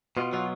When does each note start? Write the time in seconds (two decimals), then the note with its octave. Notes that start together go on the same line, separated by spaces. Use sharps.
0.17 B2 F4
0.33 F#3 F4